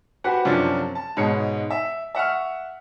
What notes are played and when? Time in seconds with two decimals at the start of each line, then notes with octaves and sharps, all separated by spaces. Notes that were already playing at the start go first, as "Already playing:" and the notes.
0.24 F#4 G4 B4 C5 F#5 G#5
0.45 F#2 C3 F3 C#4 D4 F4
0.95 A5
1.17 G#2 B2 G#3 C#5 C#7
1.70 E5
2.15 E5 F#5 C#6 F6